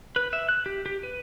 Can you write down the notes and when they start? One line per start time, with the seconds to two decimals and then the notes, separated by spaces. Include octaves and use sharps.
0.16 B4
0.33 E5
0.49 F#6
0.66 G4
0.86 G4
1.03 B4